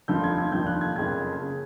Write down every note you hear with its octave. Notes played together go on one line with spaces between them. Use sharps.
F1 D#2 D3 F3 G6
G#6
G#6
F1 D#2 D3 F3 G6
F#6
G#6
F#1 F2 C#3 G#6
C#3